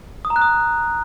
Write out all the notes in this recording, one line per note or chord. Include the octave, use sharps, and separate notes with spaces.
D#6
A#5
F#6
D#6